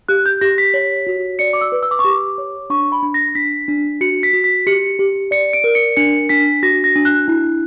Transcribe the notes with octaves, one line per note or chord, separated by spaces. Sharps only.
G4 F#6
G6
G4 A#6
B6
C#5
F#4
D5 C#7
D6
E6
B4
E6
D6
C#6
G4 D6
C#5
D4 C#6
B5
D4
A#6
D4 B6
D4
F#4 C#7
B6
F#4
B6
G4 C#7
G4
D5 C#7
D7
A#4
C#7
D4 C#7
D4 B6
F#4 A#6
A#6
D4
F#6
E4